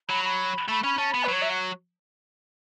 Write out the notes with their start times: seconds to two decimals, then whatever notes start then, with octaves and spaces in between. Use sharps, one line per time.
0.09 F#3 B5
0.24 B5
0.69 A3 B5
0.84 C#4 B5
0.98 C#4 A5
1.11 B3 B5
1.23 B4
1.28 F#3 C#5
1.42 E5
1.49 F#5